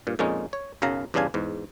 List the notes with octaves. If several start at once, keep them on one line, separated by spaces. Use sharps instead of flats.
G2 A#2
F2 A#2 G#3 C#4 D#4
C#5
B1 F#2 C#3 F5 A#5
E2 G2 C#3 D4 F5 G#5
E2 G#2